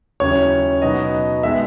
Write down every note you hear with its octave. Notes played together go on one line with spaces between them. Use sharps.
D#2 C#3 F#3 C#4 E4 C#5
B2 F#3 B3 D#4 D#5
D#3 G#3 B3 E5